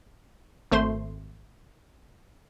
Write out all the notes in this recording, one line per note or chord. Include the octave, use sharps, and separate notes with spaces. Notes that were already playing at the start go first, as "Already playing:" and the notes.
G#1 A3 C5 C6